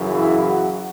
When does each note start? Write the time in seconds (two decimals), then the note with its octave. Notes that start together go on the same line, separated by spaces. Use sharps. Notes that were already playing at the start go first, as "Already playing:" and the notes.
Already playing: F#2 C#3 E3
0.12 E4
0.44 F#4